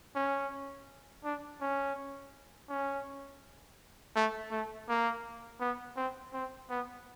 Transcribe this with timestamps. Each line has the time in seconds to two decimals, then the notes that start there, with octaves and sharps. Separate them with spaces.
0.15 C#4
1.24 D4
1.61 C#4
2.70 C#4
4.15 A3
4.51 A3
4.88 A#3
5.61 B3
5.97 C4
6.33 C4
6.70 B3